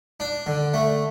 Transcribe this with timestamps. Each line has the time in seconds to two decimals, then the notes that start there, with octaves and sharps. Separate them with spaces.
0.20 D4
0.46 D3
0.74 A3